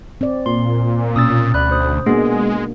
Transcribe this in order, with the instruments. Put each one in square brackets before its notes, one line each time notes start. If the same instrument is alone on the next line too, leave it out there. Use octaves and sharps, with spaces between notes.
[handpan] C4 D5
[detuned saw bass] A#2 [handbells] C6
[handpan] B2 C#4 [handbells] D#6 E6 A6
[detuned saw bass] D2 [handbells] D5 B5 F#6
[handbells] C5 D#6
[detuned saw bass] G#3 [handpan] A#3 D4 F#4 [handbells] B3 G#4